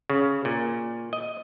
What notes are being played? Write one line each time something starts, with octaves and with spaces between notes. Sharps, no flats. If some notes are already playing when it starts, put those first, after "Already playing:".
C#3
A#2
D#5